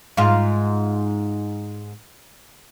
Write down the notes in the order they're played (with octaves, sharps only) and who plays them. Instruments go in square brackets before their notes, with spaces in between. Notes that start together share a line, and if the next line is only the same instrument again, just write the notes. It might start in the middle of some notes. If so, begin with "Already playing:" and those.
[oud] G#2 F4